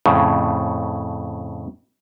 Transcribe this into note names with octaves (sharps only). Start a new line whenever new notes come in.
F2 A2 C#3